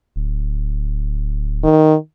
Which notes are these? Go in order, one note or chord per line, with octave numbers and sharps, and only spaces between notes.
D1
D#3